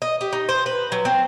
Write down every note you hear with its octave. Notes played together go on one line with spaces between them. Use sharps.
D#5
G4
D#4
C5
B4
F#3
C4